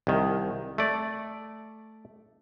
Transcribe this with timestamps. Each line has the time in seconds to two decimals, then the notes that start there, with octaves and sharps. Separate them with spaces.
0.07 C2 D#3
0.78 A3 D5